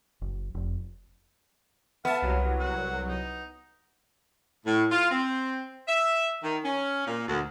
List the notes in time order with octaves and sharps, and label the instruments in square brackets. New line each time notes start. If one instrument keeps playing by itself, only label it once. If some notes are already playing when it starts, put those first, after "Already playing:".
[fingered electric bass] F#1
F1
[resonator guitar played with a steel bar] B3 [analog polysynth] E5 A5 [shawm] F5
[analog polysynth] C2 F#3
[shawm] F#4
D#4
[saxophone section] A2
F4
C4
E5
D#3
C#4
A#2
D2